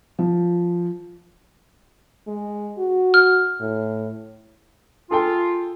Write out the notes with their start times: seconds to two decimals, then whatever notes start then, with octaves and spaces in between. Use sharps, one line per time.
0.19 F3
2.28 G#3
2.78 F#4
3.14 F6
3.61 A2
5.11 F4 G#4 A4 G5